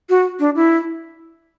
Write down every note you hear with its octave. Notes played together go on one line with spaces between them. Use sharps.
F#4
D4
E4